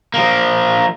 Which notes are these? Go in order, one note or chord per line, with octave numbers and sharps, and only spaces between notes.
F3 A#3